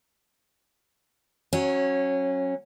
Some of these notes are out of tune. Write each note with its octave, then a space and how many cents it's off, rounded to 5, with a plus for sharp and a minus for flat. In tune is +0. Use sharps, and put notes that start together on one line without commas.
F#3 +0 C#4 -20